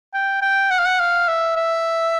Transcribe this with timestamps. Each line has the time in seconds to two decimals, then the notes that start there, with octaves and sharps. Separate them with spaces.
0.14 G5
0.42 G5
0.70 F#5
0.79 F5
0.85 F#5
1.00 F5
1.28 E5
1.56 E5